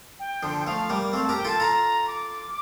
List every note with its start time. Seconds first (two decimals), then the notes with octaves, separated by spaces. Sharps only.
0.19 G5
0.43 D3 F3
0.59 G5
0.66 F3 A3 F5
0.89 G3 A#3 G5
1.13 A3 C4 F5
1.25 G4 A#4 A5
1.37 G5
1.45 F4 A4 A5
1.60 F4 A4 A#5
2.07 D6